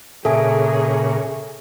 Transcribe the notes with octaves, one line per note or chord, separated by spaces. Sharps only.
A#2 C#3 G#4 A4 E5 G#5